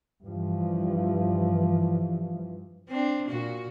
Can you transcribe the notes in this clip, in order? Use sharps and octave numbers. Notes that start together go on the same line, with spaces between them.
G2 E3 F3
C4 D4
A#2 F#4